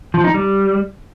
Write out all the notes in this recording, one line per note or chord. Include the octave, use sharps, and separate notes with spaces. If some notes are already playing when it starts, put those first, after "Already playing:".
F3
D#4
G3